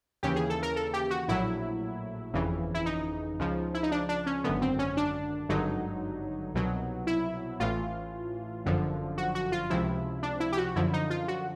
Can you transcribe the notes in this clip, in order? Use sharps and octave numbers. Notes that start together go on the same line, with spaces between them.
D#2 C#3 E3 G4
G#4
A4
A#4
A4
G4
F#4
A#1 A2 F#3 E4
G1 F2 C#3 E3
E4
D#4
C#2 C#3 F3
E4
D#4
D4
D4
C#4
G#1 F#2 D3 B3
C4
C#4
D4
G#1 G2 D3 F#3 D#4
C2 B2 F#3
E4
A1 A2 E3 F4
G1 F#2 D3 F3
F#4
F#4
F4
C#2 C3 F3 E4
D4
E4
G4
F#4
F#2 D3 F3 E4
D#4
F4
F#4